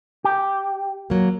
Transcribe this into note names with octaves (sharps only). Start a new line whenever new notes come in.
G4
F#3 A#3